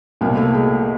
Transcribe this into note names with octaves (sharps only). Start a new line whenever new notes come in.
C2 B2 A#3
A3
G#3